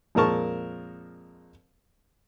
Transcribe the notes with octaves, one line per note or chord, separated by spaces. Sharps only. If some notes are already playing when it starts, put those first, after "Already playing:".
F2 A#2 G#3 A#4 A5 C#6